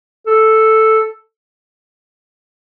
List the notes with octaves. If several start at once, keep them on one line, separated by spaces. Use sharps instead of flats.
A4